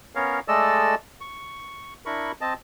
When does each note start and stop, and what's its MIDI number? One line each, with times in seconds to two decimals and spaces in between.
0.15 0.40 59
0.15 0.40 61
0.15 0.40 70
0.15 0.40 73
0.15 0.40 77
0.48 0.95 56
0.48 0.95 57
0.48 0.95 69
0.48 0.95 74
0.48 0.95 75
0.48 0.95 88
1.21 1.94 85
2.06 2.32 62
2.06 2.32 64
2.06 2.32 70
2.06 2.32 83
2.06 2.32 85
2.41 2.54 60
2.41 2.54 75
2.41 2.54 81